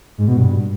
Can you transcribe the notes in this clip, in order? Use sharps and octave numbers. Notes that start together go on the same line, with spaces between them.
G#2
B2
G2